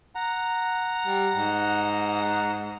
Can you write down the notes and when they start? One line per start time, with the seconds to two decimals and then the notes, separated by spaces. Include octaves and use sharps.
0.15 F#5 A#5
1.07 G3
1.35 G#2